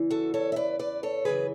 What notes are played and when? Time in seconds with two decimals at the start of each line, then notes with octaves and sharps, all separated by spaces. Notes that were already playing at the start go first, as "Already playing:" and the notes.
Already playing: E2 C#3 E3
0.10 F#4 A4
0.34 A4 C#5
0.52 E5
0.56 B4 D5
0.79 B4 D5
1.03 A4 C#5
1.25 F#2 C#3 E3 G#4 B4